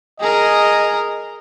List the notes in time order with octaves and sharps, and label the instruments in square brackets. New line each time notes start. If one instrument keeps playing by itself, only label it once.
[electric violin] G#4 A#4 [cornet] D#5